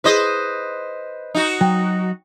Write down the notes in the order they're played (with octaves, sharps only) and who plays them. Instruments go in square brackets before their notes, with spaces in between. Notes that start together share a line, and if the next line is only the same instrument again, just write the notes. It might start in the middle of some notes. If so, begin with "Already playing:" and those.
[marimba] E4 G#4 [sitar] B4 C5 D#5
[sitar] D#4 F#4
[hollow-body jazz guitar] F#3 [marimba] G5